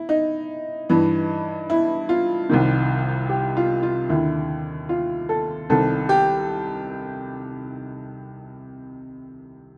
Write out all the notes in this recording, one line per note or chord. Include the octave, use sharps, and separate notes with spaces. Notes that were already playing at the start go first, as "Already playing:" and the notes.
Already playing: E4
D#4
G2 E3
E4
F4
C2 C3 D#3
G4
F4
F4
D#2 D3 E4
F4
A4
C2 C3 D#3 A4
G4